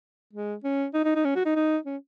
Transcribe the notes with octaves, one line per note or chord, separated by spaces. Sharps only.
G#3
C#4
D#4
D#4
D#4
C#4
F#4
D#4
D#4
C#4